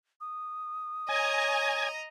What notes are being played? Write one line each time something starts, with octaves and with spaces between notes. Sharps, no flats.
D#6
C#5 D#5 G#5 A#5